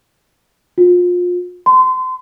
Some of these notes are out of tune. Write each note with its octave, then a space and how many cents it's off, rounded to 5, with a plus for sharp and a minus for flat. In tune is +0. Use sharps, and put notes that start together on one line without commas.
F4 +30
C6 -30